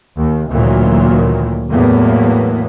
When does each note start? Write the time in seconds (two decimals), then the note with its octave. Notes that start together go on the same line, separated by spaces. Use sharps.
0.17 D#2
0.51 D2 A#2 D#3 E3 F#3
1.70 E2 A2 F#3 A#3 B3